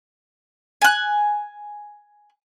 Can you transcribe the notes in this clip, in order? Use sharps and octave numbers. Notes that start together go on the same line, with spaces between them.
G#5 F#6